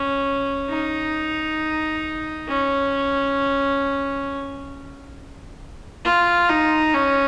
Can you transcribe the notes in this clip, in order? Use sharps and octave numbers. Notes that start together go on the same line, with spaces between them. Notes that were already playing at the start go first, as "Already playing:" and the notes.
Already playing: C#4
D#4
C#4
F4
D#4
C#4